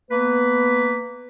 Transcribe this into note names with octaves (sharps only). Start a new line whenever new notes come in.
A#3 B3 B4